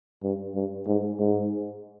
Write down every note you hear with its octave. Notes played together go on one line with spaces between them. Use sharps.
G2
G2
G#2
G#2